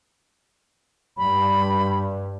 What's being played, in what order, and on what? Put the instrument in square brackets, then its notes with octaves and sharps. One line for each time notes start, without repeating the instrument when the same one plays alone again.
[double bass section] G2 [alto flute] B5